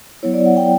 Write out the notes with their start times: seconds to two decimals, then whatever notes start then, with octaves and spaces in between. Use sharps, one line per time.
0.23 F#3 B3 E4 C#5
0.34 D5
0.46 F#5
0.57 G5